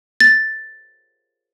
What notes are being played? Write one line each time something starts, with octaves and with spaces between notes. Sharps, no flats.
A6